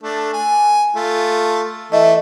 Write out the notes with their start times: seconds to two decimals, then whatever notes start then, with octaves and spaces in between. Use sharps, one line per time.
0.03 A3 D4
0.33 G#5
0.96 A3 F4
1.92 E3 A3 D#5 E5